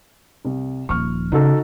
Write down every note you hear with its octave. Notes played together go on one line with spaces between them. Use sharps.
C2
D#1 F3 C#6 F6
C#3 D#4 F#4 A4